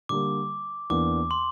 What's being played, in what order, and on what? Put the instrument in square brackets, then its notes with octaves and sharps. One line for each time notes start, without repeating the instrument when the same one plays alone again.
[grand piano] D3 G3 A#3 [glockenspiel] D6
[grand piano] E2 E3 A#3 D4 [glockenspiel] D6
[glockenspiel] C6